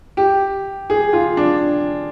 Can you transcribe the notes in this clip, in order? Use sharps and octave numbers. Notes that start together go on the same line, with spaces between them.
G4
G#4
F4
D4